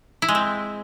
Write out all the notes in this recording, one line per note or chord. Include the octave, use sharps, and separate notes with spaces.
E4
G#3
C4